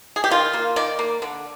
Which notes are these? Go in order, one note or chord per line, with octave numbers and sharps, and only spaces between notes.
G#4
G4
D#3 F4
A#3
D#3 D5
A#3
D3